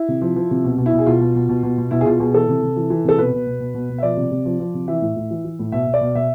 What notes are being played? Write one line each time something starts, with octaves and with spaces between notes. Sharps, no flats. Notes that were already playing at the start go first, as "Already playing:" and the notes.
Already playing: E4
C3
F3
F3
C3
B2
B2
E4
B2
G#4
B2 F4
B2
B2
B2
B2
B2
B2 E4
G#4
B2 F4
B2 G#4
E3 A4
C3
C3
E3
E3
C3 A4
B2 B4
B2
B2
B2
B2
B2
E5
F3 D5
C3
C3
F3
F3
C3
E3 E5
A2
A2
E3
E3
A2
B2 E5
B2
D5
B2
B2 E5